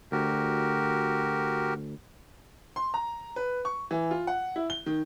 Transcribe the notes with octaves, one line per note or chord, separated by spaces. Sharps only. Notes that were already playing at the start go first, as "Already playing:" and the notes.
D2 F#4 G4 A#4
C6
A#5
B4
C#6
E3
F4
F#5
E4
G7
D#3